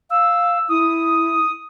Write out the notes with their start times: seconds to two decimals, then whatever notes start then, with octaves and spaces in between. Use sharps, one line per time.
0.10 F5 E6
0.69 E4 D#6